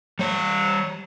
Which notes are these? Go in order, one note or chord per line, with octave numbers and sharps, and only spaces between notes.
G3 C#5